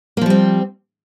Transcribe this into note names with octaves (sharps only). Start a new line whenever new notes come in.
F3 G3 A#3 C4